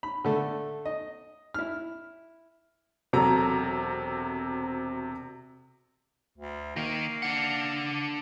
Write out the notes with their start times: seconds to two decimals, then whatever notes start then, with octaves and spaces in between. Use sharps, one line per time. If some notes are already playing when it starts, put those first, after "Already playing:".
0.03 B5
0.25 D3 A3
0.85 D#5
1.54 E4 F6
3.13 E1 C3 F#3 A4 A#5
6.37 D2
6.76 D#3 A#3
7.22 D4 F#5